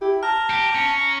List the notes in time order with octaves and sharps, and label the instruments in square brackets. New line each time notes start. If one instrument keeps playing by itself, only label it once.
[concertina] E4 [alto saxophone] G4
[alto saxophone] A5 [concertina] A#5 [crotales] F6
[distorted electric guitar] G4
C#4